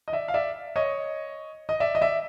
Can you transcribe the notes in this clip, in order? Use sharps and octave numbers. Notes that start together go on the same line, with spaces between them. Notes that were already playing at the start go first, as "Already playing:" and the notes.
D#5
D5 E5
F5
D5 E5
C#5 D#5
D#5
D5 E5
D#5
D5 E5